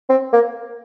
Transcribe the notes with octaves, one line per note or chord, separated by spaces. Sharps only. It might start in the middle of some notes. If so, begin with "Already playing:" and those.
C4
A#3